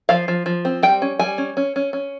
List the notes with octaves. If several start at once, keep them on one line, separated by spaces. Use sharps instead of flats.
F3 F5
F3
F3
C4
G3 G5
C#4
G3 G#5
C#4
C#4
C#4
C#4